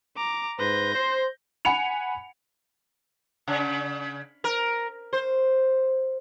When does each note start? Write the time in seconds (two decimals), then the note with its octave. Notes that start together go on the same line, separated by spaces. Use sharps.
0.17 A#5 D6
0.59 G#2 B4 C5 G6 A#6
0.94 C5
1.65 F#5 G#5 B5 C#7 F7
3.48 C#3
4.44 A#4
5.13 C5